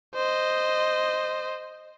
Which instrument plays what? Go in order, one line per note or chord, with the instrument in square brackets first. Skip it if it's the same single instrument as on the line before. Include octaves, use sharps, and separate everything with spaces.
[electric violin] C5 D#5